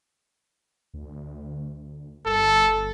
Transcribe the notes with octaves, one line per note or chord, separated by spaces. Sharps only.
D2
G1 A4